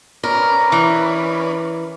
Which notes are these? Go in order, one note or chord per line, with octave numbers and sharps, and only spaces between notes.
C#4 A#4 B4 D5
E3